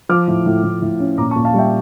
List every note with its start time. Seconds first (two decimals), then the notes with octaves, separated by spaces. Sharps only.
0.09 F3 D6 F6
0.28 A2
0.46 A2
0.63 A2
0.82 A2
1.00 C#4
1.18 A#2 A#5 D6
1.31 A5 C#6
1.36 A#2
1.45 F5 A5
1.54 G3 E5 G5